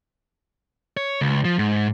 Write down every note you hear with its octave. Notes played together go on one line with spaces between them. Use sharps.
C#5
C#2
F3
G#2